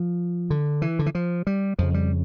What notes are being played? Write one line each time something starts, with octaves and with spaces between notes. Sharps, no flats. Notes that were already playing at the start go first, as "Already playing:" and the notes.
Already playing: F3
D3
E3
D3
E3
F3
G3
F2 C#3 F3
G3